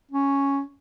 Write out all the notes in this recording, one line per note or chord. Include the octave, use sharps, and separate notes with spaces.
C#4